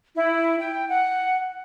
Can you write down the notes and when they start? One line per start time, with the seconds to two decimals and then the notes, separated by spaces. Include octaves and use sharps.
0.15 E4
0.58 G5
0.87 F#5